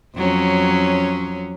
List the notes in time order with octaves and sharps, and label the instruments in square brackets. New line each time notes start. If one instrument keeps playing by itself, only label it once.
[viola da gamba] F2 F#3 C#4